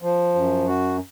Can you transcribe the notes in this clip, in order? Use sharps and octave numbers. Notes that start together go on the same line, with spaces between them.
F3
F#2
F#4